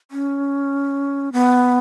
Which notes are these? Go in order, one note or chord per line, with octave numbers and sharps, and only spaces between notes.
C#4
B3